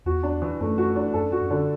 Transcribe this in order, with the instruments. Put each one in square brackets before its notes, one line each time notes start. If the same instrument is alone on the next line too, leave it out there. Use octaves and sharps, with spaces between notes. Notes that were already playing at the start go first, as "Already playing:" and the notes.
[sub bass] E2 [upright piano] F#4
[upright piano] D4
E3
[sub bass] F#2 [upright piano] A3
[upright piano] F#4
D4
[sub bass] F#2 [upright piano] A4
[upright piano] F#4
[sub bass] F#2
[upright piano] D3